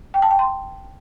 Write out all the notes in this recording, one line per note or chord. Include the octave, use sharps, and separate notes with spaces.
G5
A5
G5
C6